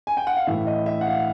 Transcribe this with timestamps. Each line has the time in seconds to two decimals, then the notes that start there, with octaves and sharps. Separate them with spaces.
0.07 G#5
0.17 G5
0.27 F#5
0.37 F5
0.47 A2 E3 E5
0.67 D#5
0.86 E5
1.01 F#5
1.07 F5